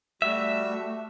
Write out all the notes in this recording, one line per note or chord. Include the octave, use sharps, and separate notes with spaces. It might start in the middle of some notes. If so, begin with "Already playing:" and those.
G3 A3 F#4 E5